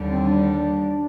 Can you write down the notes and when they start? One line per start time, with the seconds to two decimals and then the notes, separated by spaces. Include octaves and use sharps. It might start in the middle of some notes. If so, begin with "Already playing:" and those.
Already playing: D#2 D3 G3
0.10 C4
0.27 D4